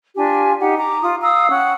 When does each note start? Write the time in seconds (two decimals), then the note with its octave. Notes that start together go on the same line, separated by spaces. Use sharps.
0.15 D4 F4 G4 G#5
0.60 D#4 G4 F#5
0.78 A#5 D6
1.01 F4 D#6
1.21 F5 A#5 D#6 E6
1.51 C#4 F#5 G5